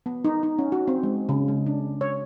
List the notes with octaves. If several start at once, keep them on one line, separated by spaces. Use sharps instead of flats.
B3
D#4
D#4
C#4
F#4
C4
G#3
C#3
G#3
D4
C#5